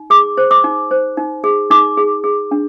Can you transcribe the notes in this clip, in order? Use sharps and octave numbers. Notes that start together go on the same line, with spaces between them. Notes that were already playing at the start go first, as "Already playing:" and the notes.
Already playing: D#4
G#4 D6
C5
D6
D#4
C5
D#4
G#4
D#4 D6
G#4
G#4
D4